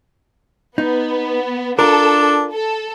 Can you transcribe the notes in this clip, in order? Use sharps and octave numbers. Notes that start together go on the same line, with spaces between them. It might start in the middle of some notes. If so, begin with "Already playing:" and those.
B3 D#4
D4 F4 A4 A#4
A4